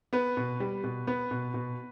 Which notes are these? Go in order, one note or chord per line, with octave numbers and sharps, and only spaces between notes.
B3 B4
B2
G3
B2
B3 B4
B2
B2